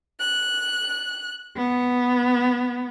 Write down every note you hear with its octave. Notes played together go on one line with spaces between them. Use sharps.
F#6
B3